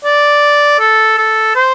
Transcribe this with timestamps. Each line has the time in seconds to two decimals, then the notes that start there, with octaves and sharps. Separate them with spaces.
0.05 D5
0.79 A4
1.18 A4
1.55 C5